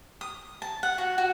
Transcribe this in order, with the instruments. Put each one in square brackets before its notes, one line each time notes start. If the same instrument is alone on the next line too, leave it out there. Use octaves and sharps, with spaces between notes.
[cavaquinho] D#6
A5
F#5
F#4
F#4